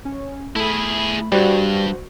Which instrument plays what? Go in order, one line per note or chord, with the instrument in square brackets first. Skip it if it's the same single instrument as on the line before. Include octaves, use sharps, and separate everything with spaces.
[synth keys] C#4
[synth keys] A3 B5 [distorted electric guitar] E4 G#4
[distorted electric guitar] G2 [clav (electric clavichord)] G3 [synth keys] F#4 C5